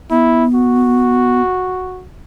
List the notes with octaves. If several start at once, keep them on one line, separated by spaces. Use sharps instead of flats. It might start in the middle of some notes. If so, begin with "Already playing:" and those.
B3 E4
F#4